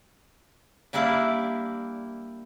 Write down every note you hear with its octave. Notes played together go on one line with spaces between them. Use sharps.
G3 A#3 D4 E4 D5